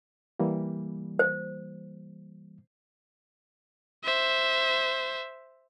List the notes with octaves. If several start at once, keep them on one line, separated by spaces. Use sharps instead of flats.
E3 G3 A#3
C5
C5 E5